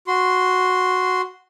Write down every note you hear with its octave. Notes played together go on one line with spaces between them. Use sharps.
F#4 C6